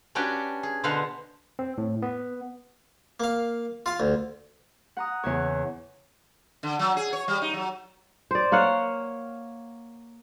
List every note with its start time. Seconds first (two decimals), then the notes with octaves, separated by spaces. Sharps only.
0.15 C#4 D4 F#4 G4 B4 G5
0.63 G#4
0.84 B2 D3 B4 C5 F5 F#5
1.59 C4
1.78 A2
2.02 B3
3.20 A#3 F5
3.86 F4 F5
4.00 D2
4.97 F#5 A#5 D#6
5.23 E2 C#3 C#5
6.63 D3
6.79 F#3
6.97 G#4
7.13 C#5
7.28 G3
7.42 D#4
7.54 F#3
8.31 C5 D5
8.52 A#3 C#5 F5 F#5